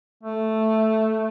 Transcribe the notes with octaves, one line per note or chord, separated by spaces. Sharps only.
A3